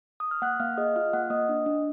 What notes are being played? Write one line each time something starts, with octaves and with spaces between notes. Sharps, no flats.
D#6
F6
A#3 F#5 F#6
A#3 F5 F6
G#4 D#5 D#6
F4 F5 F6
A#3 F#5 F#6
A#3 D#5 D#6
D4
D4